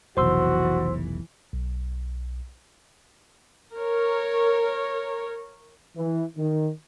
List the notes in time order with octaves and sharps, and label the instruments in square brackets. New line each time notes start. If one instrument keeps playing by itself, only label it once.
[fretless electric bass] F1 B1 [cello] E3 [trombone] F#4 [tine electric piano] C5 C6 E6
[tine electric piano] B1
[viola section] A#4 C#5
[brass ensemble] E3
D#3